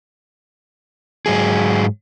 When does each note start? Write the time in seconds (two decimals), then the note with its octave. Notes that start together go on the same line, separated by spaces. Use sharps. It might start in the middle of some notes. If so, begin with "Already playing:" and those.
1.26 G#2 F#3 G#4